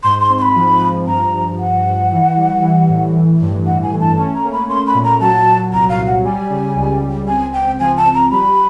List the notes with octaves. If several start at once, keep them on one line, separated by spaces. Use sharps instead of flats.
G#2 C6
C6
C4
C6
B5
F3
F3
G2 A#5
G2
G2 F#5
G2
E3
G3
E3
A2
E3
G2
E3 F#5
G#5
A3
A5
C#4 A5
A#5
A#3
B5
C#4 C6
B5
A#2
A#5
F#3 A5
A#2
C2 A#5
F5
C2
F#5
G3 G#5
C#3
C#2
C#2
C4 G#5
C4 G5
F3 G#5
A5
F3
A#5
G3 B5